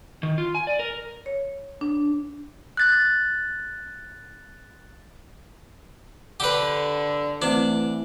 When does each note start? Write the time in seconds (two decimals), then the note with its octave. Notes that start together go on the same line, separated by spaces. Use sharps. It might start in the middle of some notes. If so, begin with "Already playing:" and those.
0.23 D#3
0.38 F4
0.55 G#5
0.67 D5
0.79 A#4
1.26 C#5
1.81 D4
2.77 F#6 A6
6.40 D3 G4 B4
7.42 E3 A3 C4 D4 C5